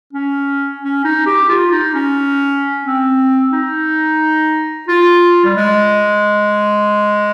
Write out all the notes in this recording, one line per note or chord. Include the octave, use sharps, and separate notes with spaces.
C#4
C#4
D#4
G4
F4
D#4
C#4
C4
D#4
F4
G3
G#3